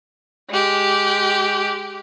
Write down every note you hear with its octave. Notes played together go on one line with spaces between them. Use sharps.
G#3 G4